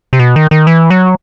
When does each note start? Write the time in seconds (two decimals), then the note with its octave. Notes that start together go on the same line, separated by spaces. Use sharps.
0.13 C3
0.19 B2
0.36 D#3
0.51 D#3
0.67 E3
0.90 F#3